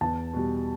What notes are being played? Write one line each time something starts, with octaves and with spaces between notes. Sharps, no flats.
E2 A5
B2 G3